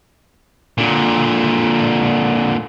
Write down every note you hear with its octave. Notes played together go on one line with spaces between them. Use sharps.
A#2 D3